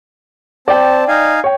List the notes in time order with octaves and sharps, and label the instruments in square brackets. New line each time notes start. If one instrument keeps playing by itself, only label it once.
[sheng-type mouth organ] C4 A5 [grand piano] D5 G5
[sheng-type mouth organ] D#4 F5 G#5
[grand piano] C#5 G5